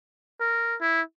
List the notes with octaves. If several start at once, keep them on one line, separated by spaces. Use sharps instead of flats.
A#4
E4